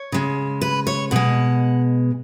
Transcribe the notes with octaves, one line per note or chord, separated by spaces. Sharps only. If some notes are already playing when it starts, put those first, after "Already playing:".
Already playing: C#5
C#3 G#3
B4
C#5
B2 G#3 F#5